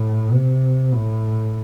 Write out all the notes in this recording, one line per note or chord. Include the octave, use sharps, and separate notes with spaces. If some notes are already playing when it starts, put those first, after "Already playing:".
Already playing: A2
C3
A2